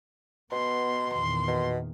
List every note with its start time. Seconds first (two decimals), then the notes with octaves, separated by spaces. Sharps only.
0.52 B2 B3 C6
1.13 E2 A#2 D#3 C6
1.48 B2